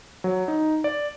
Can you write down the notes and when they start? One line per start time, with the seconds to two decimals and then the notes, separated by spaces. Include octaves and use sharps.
0.24 F#3
0.48 D#4
0.84 D5